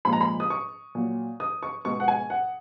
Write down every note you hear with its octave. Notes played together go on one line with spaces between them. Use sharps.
A#2 F3 G#3 B5
A#5
B5
D#6
C#6
A#2 F#3
D#6
C#6
B2 G#3 C#6
F#5
G#5
F#5